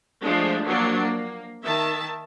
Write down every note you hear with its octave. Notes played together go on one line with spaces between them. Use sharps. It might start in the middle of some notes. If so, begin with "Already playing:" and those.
F3 G#3 A3 D4
F3 F#3 A#3 D4
A#3
D#3 E5 A5